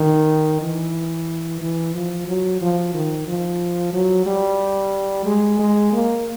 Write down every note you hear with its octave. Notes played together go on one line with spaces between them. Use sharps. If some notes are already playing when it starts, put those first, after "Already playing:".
Already playing: D#3
E3
E3
F3
F#3
F3
D#3
F3
F#3
G3
G#3
G#3
A#3